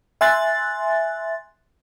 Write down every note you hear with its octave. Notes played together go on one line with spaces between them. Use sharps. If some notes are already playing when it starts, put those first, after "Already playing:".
E5 G#5 C6 F#6 A6